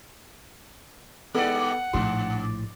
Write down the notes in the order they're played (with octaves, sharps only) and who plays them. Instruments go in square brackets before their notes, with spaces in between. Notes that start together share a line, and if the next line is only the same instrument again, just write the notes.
[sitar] G3 D#4 D5 [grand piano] B3 A4 [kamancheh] F#5
[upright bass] A#1 A2 [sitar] F#2 [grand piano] C6